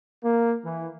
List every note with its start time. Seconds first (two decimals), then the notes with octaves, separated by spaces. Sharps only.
0.24 A#3
0.65 E3